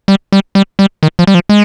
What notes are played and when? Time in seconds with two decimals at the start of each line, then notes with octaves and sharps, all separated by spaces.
0.08 G3
0.32 G3
0.55 G3
0.79 G3
1.03 D#3
1.19 F3
1.27 G3
1.34 F3
1.49 G#3